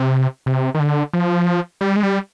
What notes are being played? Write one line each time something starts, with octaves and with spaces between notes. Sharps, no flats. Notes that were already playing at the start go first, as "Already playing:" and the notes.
Already playing: C3
C3
D#3
D3
F3
G3
G#3
G3